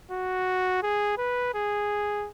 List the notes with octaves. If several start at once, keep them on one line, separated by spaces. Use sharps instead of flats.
F#4
G#4
B4
G#4